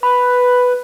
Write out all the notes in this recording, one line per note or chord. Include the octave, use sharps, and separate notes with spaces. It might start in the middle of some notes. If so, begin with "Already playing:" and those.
B4 B5